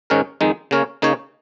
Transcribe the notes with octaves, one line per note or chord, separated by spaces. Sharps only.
G#2 D#3 C#4 A#4
F2 D#3 G#3 D#4
C#3 A#3 C#4 A#4 C#5
C#3 A#3 D#4 C#5